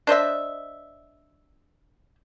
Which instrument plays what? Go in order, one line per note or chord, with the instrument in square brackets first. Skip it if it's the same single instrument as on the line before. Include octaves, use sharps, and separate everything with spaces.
[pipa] D4 C5 D#5 E5